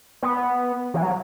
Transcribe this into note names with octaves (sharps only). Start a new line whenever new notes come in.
B3
E3
F#3